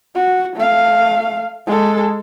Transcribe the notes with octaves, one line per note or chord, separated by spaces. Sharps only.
F#4
A3 F5
G#3 A4